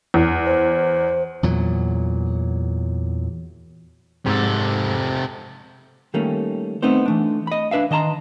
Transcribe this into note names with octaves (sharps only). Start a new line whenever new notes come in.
E2
C5
E2 A#2 F#3
G#2 C3 A4
D#3 G3 A3 A#3 C#4
A3 B3 C4 D#4 C5
E3 A3 D4
D#5 B5
D4 B4 E5 F5
D#3 D#5 A5 A#5 C6